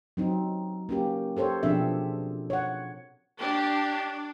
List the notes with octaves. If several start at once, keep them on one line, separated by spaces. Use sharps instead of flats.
F#3 C4 D#4
A#3 C#4 G4
G4 A4 C5 C#5
B2 F3 C4 D4 G#4 E5
C#5 F#5
D4 G4